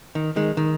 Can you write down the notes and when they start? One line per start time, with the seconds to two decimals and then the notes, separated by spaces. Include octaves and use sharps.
0.15 D#3
0.36 D#3 G#3
0.57 D#3